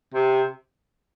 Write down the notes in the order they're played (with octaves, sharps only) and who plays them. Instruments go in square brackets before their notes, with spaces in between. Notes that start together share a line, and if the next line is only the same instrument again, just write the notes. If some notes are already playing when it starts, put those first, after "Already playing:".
[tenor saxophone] C3